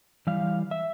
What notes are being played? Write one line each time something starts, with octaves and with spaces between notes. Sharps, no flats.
E3 G3 F5
E5